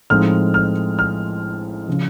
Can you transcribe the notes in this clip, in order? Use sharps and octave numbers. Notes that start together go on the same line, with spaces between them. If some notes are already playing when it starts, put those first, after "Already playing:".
A2 F3 G#3 C4 D#4 F6
F6
F6
C#3 F3